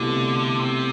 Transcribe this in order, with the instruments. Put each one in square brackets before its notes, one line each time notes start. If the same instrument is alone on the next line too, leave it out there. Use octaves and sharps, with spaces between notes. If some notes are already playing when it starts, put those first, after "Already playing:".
Already playing: [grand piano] C2 B2 A3 E4 [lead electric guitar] D3
[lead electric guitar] C3